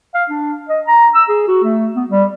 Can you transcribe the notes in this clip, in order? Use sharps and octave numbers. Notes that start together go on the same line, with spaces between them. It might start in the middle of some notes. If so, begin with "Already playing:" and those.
F5
D4
D#5
A#5
E6
G#4
F#4
A3
B3
G3